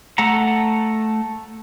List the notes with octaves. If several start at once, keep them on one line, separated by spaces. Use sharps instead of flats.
A3 A4 F#5 A#5